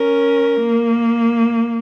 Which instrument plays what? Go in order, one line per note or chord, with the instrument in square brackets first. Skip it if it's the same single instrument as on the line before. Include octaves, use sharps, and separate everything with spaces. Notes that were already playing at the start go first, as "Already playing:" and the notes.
Already playing: [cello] C#4 [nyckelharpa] A#4
[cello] A#3